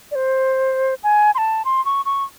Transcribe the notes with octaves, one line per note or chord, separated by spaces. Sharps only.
D5
C5
G#5
C6
A5
C6
C#6
C#6